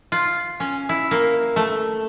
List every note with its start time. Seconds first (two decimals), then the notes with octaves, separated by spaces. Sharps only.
0.12 F4
0.60 C#4
0.89 E4
1.11 A#3
1.56 A3